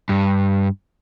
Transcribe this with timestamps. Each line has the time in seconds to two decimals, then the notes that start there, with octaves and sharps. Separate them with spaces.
0.09 G2